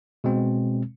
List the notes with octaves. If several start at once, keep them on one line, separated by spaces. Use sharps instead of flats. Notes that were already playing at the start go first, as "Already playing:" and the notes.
B2 G#3 C4